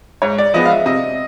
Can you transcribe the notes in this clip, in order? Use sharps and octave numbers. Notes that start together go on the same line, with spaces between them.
G#2 C#5
D5
F3 G#3 B3 D#5
F5
E5
C3 D#5